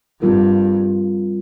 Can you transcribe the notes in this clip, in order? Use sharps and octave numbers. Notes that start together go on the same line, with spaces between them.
G2 G3 C4 F4 A#4